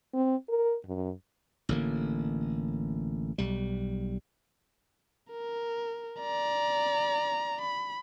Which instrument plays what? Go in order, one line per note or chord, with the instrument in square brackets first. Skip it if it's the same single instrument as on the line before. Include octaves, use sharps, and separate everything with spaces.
[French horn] C4
A#4
F#2
[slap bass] A1 D3 A#3
B1 G3
[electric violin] A#4
D5 A#5
B5